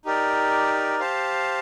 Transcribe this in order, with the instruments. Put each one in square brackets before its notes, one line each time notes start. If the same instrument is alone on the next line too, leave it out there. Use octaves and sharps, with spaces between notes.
[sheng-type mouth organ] D#4 G4 A#4 D5
G4 C5 F5 A5